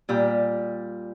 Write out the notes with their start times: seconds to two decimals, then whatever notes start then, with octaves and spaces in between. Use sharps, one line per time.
0.09 A#2 G3